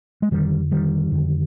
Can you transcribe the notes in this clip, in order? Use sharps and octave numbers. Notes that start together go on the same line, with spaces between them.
G#3
F2 D3 D#3 G3
D#3 G3
F2 D3